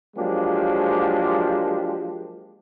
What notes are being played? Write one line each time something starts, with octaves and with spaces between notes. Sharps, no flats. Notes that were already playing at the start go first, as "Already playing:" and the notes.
F3 F#3 G#3 A#3 D4 G4